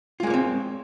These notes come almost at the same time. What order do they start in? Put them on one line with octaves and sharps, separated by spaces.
F4 G#3 A#3 C#5 C4